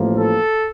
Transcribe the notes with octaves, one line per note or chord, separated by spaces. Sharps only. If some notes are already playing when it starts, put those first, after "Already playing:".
Already playing: A1 A2 F3 A#3
A4